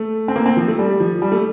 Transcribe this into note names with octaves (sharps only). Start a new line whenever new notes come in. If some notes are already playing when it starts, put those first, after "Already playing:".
Already playing: A3
C4
A#3
C4
F3
A3
G3
F3
G3
A3